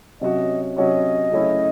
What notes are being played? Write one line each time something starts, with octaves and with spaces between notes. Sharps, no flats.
C3 F#3 C#4 F#4 D#5
C3 F#3 C#4 F#4 D#5
C#3 F#3 A3 C#4 E4